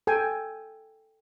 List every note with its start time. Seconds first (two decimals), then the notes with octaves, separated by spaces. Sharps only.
0.07 A4 G5 G#5